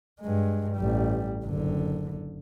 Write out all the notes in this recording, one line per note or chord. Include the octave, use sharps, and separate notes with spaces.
G2 G#3
A1 G3
F#1 D3